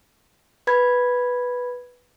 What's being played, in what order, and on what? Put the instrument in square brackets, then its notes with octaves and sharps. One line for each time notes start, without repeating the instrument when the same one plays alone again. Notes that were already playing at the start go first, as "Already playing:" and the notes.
[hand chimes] B4 B5 G#6